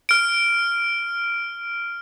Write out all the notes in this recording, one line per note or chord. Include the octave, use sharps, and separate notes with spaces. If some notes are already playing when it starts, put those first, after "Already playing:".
F6 D7